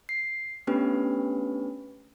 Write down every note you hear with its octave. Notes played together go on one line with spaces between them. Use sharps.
C7
A3 B3 C#4 D4 G4 B4